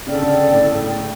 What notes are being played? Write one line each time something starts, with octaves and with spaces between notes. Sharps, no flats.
C#3 A4 D5 G5
D3
C#3
A2